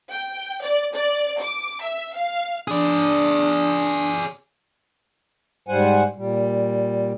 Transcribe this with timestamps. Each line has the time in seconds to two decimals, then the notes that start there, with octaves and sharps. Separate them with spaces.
0.11 G5
0.62 D5
0.94 D5
1.40 D6
1.82 E5
2.14 F5
2.68 D4 G#4 D5
5.69 G#2 G3 C5 F#5 G#5
6.16 A#2 G3